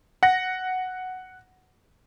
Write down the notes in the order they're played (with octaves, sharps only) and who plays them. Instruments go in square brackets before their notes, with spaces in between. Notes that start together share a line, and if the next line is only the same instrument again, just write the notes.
[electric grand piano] F#5 A#6